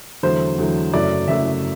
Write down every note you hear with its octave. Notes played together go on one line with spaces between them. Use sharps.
E2 D3 F#3 A3 C5
E2 D3 F#3 A3
F#1 F#2 F#3 A3 D5
F#1 F#2 F#3 A3 E5